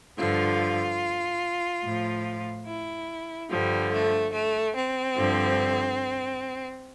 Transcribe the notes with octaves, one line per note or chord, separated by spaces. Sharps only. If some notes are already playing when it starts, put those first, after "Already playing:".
G2 D3 F3 F4
A2 F3
E4
G2 D3 F3 G3
A3
A3
C4
G2 D3 F3